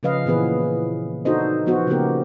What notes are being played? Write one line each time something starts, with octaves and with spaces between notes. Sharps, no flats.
C#3 F3 C#4 B4 D#5 F5
A#2 E3 B3 G#4 B4
D4 D#4 F#4 A4 C5 D#5
F3 B3 F#4 C5
C#3 F3 A#3 B3 G4 A#4